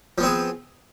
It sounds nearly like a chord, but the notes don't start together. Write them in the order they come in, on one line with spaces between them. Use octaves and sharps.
F3 B3 C4 G#4